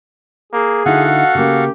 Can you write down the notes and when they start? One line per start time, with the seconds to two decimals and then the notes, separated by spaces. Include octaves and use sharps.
0.53 A#3 G#4
0.86 D3 D#4 E4 F#4 A4 F5 F#5
1.35 C#3 A#3 G4